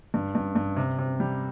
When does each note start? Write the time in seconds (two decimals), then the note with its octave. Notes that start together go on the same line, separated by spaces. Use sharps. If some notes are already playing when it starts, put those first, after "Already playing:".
0.14 G2
0.35 G2
0.56 G2
0.76 C3
0.99 C3
1.20 G3